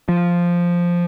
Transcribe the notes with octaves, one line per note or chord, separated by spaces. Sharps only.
F3